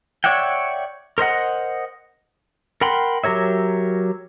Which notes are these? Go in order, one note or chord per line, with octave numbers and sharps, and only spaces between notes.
C#5 D5 E5 F#5 G5
A#4 C5 D#5 F#5
A#4 F#5 G5 B5 C6
F#3 G4 A#4 C#5 E5